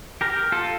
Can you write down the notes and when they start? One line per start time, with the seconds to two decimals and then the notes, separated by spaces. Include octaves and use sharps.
0.21 G4 A#4
0.52 F4 A4